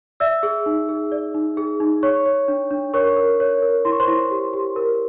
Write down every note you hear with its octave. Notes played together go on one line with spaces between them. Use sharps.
D5 E5 E6
G#4
D#4
G#4
D5
D#4
G#4
D#4
C#5 C#6
C#5
D4
D4
A#4 C#5 C#6
A#4
C#5
A#4
E4 C6
C#6
C5 C6
E4
G4
G4
A#4